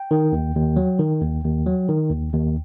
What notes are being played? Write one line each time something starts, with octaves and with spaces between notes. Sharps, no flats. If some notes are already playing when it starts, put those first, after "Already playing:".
Already playing: G5
D#3
D#2
D#2
F#3
D#3
D#2
D#2
F#3
D#3
D#2
D#2